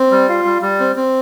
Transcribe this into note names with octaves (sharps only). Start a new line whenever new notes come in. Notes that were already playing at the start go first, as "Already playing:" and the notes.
Already playing: C4
G3
F4
G3
G3
C4
C4